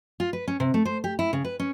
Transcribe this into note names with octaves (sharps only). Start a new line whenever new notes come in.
F4
B4
C#4
C3
A3
C5
G4
E4
C#3
B4
C#4